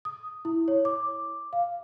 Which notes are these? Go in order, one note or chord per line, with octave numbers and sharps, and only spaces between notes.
D#6
E4
C#5
D6
F5